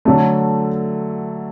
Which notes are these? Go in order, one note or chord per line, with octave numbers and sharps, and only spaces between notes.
D3 F#3 A3